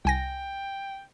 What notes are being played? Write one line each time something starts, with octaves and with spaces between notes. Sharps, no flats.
C2 G5 G#5 A#6